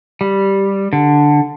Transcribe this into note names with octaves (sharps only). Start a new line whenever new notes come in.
G3
D3